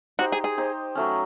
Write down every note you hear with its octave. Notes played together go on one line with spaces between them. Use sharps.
D#4 F#4 G4 C5 D#5
G#4
G#4
D#4 G4 C5 D#5
F#3 A3 C#4